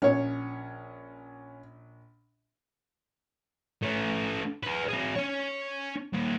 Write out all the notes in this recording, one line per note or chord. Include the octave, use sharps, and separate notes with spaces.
A#1 C#4 C#5
A3 C#4
G#4 B4
C4 G#4
C#4 C#5
D#2 A#2